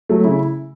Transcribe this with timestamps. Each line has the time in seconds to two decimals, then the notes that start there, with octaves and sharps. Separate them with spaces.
0.09 F#3 A3
0.24 C#3 E4